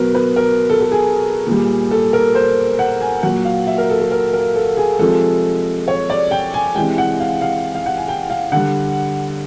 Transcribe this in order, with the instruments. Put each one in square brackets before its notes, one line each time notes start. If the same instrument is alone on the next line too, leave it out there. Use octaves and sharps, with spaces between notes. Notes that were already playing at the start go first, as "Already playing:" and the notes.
Already playing: [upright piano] B2 F#3 A#4 B4
B4
A#4
A4
A4
G#4
A#2 G3
A4
A#4
C5
F#5
G#5
A#2 F#3 F#5
F5
E5
A#4
A4
A4
A#4
A#4
A4
G#4
C3 F3 G#3 A4
C#5
D5
G5
G#5
C3 E3 G#3 G5
F#5
F5
F5
F5
F#5
G#5
G5
F5
D3 G3 F#5